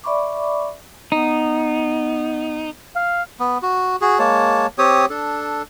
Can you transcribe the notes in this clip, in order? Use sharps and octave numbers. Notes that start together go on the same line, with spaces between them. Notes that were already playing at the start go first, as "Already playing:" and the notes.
D5 E5 B5 C#6 D6
B3 D#4
F5
B3
F#4
F#4 G#4
G#3 A#3 C#5 A5
C4 G4 C#5 D#6
D4 A4